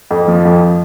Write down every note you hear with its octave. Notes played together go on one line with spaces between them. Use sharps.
F2
F3
F2